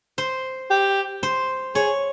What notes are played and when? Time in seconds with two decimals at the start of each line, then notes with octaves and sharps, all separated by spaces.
0.18 C5
0.70 G4
1.23 C5
1.75 G#4 C#5